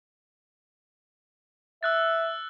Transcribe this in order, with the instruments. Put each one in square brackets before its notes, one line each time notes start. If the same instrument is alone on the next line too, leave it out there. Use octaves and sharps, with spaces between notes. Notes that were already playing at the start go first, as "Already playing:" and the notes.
[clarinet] E5 [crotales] E6 F#6 A6